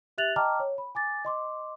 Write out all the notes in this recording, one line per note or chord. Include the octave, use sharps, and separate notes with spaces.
G4 E5 F#6 A6 F7 F#7
D#5 G5 A5 A#5 D6 F6
C#5
B5
G#5 D6 A6
D#5 C6 D6